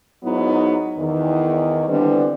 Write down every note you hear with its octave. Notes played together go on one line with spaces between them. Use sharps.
G#2 F#3 B3 D#4 E4
E2 D#3
D3 E3 G3 B3 C4 D4